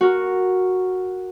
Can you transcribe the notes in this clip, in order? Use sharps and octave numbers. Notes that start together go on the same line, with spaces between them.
F#4 A#4